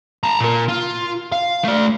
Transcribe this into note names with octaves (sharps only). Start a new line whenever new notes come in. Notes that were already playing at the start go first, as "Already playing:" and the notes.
A5 A#5
A#2 A#4
F4
F5
A3 D5